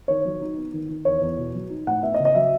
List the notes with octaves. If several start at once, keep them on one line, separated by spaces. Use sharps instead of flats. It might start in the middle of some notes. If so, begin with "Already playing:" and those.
D#3 C#5
F#3
D#4
B3
D#3
D#3
E2 C#5
E2
B2
F#3
D#4
A2 F#5
B3 E5
D#5
C#3
D#5
F#3 E5